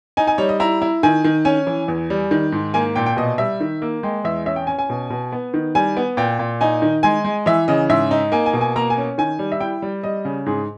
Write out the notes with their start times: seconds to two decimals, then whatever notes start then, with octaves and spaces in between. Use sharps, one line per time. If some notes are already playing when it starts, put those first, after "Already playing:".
0.17 D#4 G#5
0.27 G#5
0.38 G3 C#5
0.49 D#5
0.60 E4 A#5
0.82 E4
1.03 D#3 G#5
1.24 D#3
1.45 C#4 G#5
1.67 E3
1.88 E2
2.10 G3
2.31 D#3
2.52 G#2
2.74 A#3 G#5
2.96 A#2 G5
3.06 G5
3.17 B2 D#5
3.38 G3 E5
3.60 D#3
3.82 A#3
4.03 G#3 G5
4.24 E2 E5
4.46 C#4 E5
4.56 G5
4.67 C#4 G#5
4.79 G#5
4.90 B2
5.10 B2
5.32 B3
5.54 D#3
5.75 G3 G#5
5.97 B3
6.17 A#2 G5
6.39 A#2
6.61 D#4 G#5
6.82 D#3
7.03 G#3 G#5
7.25 G#3
7.46 E3 E5
7.68 C#3 D#5
7.89 G#2 E5
8.11 D#4
8.32 A#3 G#5
8.46 G#5
8.53 B2
8.61 G#5
8.76 A#3 A#5
8.90 G#5
8.97 C#4
9.18 D#3 G#5
9.39 G3
9.52 E5
9.60 E4 G5
9.82 G3
10.03 G3 D#5
10.25 C#3
10.46 G#2 G#4